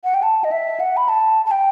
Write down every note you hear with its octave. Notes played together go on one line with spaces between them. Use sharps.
F#5
G5
A5
D#5
E5
F#5
B5
A5
A5
G5